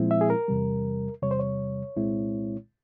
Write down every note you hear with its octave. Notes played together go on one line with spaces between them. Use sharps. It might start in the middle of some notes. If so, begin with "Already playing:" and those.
Already playing: A#2 F3 G#3 C4 E4
E5
G#4
A#4
E2 C3 G3
E2 C3 G3 C#5
C5
C#5
C2 A#2 G#3 C4 E4